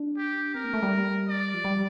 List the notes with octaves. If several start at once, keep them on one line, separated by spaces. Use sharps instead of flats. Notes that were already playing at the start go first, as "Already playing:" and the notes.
Already playing: D4
G4
C4 A#4
A#3
A3
G3
D5
F3
G3